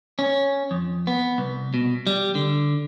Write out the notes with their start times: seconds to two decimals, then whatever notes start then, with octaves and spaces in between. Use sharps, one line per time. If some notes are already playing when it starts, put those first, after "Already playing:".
0.19 C#4
0.71 F2
1.07 B3
1.38 C2
1.74 B2
2.07 G3
2.35 D3